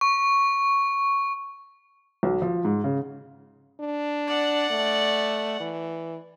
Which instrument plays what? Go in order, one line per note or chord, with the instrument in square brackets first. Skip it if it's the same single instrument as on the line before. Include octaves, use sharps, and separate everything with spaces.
[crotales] C#6
[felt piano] B1
F3
G#2
C#3
[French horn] D4
[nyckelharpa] D5 F#5
[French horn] A3
E3